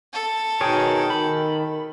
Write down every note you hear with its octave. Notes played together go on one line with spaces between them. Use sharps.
A4
B2 D#3 G#4 A#4 C#5 G5
D#3 B5